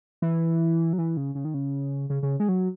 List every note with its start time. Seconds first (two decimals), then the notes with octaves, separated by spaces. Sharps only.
0.22 E3
0.93 F#3
0.98 E3
1.17 C#3
1.35 C#3
1.45 D#3
1.54 C#3
2.10 C#3
2.23 C#3
2.40 G#3
2.49 F#3